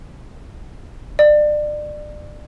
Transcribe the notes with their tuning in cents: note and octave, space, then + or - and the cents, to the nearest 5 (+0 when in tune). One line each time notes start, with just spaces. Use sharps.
D5 +30